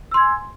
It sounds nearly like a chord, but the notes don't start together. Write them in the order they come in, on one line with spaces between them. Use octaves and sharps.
E6 C6 G#6 G#5